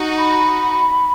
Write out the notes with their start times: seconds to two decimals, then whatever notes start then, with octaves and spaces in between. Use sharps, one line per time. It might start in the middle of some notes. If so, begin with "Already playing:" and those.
Already playing: D#4 F#4
0.18 B5